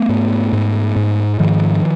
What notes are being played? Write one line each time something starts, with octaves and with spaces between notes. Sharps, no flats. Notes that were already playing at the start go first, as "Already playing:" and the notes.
Already playing: A3 B3
G#2
G#2
G#2
G#2 D#3 F3